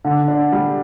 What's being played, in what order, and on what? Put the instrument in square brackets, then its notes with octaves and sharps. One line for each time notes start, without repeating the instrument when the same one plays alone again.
[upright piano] D3
D4
G3